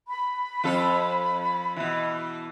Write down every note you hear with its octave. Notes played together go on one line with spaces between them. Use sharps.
B5
F2 F4 A4
B2 E3